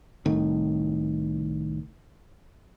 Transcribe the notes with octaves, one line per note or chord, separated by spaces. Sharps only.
C2 A2 D#3